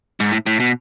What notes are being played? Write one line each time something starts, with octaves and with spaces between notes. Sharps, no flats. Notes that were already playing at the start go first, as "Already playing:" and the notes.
G#2
A2
A2
B2